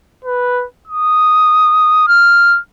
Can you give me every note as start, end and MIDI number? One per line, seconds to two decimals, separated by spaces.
0.24 0.65 71
0.87 2.04 87
2.08 2.59 89